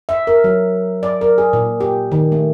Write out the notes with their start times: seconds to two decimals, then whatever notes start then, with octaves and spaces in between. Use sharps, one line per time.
0.09 E5
0.27 A#4
0.44 F#3
1.03 D5
1.21 A#4
1.38 G#4
1.53 A#2
1.80 G4
2.12 D#3
2.32 A3